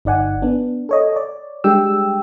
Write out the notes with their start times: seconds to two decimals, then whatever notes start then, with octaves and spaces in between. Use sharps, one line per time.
0.05 G1 D#4 D5 F#5 G#5
0.42 B3 D4
0.89 A4 C#5 D#5
1.13 C#5 D5
1.64 G3 G#3 D4 G4 G5 E6